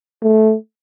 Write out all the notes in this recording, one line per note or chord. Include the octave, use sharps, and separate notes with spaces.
A3